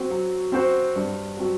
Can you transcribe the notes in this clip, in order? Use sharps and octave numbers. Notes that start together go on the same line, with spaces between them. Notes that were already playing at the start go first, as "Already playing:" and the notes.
Already playing: F#3 C4 F#4 C5
F#3
C4 F#4 C5
G2
F#3 C4 F#4